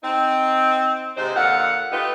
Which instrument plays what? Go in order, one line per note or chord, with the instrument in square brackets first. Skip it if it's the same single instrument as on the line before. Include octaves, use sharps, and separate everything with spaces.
[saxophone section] C4 D#4
G#2 C3 D#4 C5
A#2 D3 F5 F#5
A3 D#4 F4 G4 B4